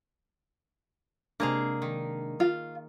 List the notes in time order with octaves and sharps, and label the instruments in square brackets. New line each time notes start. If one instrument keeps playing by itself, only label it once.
[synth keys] C3 G#3 D4 [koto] A#3 G#4 F5
[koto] D#3
[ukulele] F4